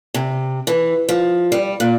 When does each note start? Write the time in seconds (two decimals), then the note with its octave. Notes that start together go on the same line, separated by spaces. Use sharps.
0.14 C3
0.67 E3
1.09 F3
1.52 G3
1.80 A#2